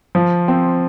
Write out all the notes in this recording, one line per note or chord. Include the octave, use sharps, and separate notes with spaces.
F3
C4